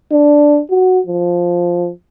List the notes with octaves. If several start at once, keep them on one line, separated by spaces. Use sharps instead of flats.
D4
F#4
F3